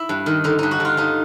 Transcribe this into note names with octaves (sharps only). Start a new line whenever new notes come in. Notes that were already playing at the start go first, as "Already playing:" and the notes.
Already playing: E4
G2
D#3
D3 D#4
G2 D#4
F#4
G2 F4
G2 D#4